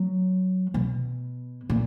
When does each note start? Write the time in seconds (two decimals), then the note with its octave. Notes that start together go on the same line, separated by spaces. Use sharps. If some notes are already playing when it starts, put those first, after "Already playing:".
Already playing: F#3
0.74 B2
1.70 A#2